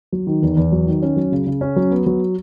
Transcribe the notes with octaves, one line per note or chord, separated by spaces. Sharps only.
F#3
D#3
E2
E2
F#3
D#3
C#4
F#3
C#3
C#3
C#4
F#3
B3
F#3